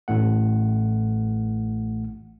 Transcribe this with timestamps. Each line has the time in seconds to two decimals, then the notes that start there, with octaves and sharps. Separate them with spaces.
0.08 A1 A2 A3 F#5